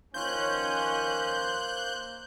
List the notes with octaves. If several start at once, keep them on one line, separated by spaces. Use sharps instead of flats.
D#3 F3 A#3 C#4 C5 F#6 G6